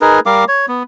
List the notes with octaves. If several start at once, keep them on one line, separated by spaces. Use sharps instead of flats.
D#4 G#4 A#4 B4
G3 A#4 F5 D6
C#5
B3